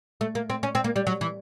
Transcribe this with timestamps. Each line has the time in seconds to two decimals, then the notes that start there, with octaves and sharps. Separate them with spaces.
0.21 A3
0.35 A#3
0.50 C4
0.63 C#4
0.75 C4
0.84 A#3
0.96 G3
1.07 F#3
1.21 E3